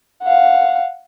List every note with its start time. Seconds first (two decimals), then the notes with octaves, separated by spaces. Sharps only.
0.23 F5 F#5